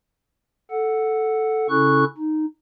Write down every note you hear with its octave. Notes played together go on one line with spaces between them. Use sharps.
A4 F#5
C#3 C#4 E4 A4 C#6 F#6
D#4